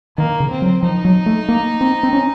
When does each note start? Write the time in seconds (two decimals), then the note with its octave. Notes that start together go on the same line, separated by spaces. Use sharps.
0.18 D#3 A#3
0.40 C#3
0.50 C4
0.62 F#3
0.83 F3 D#4
1.05 F#3
1.26 A3
1.49 A#3
1.81 C4
2.03 C4
2.13 C#4